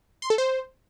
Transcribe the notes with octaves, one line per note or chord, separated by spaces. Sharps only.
C6
A4
C5